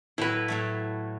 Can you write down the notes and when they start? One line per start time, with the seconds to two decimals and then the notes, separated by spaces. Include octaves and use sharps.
0.18 A2 F#3 E4 B4
0.48 A2 F#3 A3